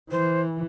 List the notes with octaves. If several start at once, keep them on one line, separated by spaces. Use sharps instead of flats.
E3 C5